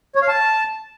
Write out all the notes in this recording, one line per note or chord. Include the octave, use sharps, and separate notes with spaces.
C#5
F5
A5